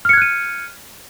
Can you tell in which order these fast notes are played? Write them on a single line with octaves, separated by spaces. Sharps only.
F6 C#7 G#6 F#6 D#7